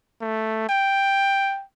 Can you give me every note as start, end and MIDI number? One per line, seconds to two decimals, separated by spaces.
0.21 0.68 57
0.69 1.63 79